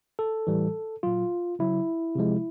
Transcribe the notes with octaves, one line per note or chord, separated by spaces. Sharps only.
A4
A2 E3 G3
A#2 F#3 F4
C#3 F#3 E4
C3 F3 G#3